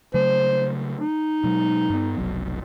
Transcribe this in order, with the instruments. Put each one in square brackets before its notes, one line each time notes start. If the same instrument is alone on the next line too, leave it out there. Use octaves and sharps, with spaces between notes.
[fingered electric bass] C#3 F#3 A3 [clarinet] C5
[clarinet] D#4
[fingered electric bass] B2 F#3 G#3
G2 A3 B3
F1 B1 F#3